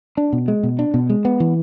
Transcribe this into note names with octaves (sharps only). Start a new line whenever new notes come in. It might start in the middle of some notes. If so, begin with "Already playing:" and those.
D4
B2
G#3
B2
D4
B2
G#3
B3
E3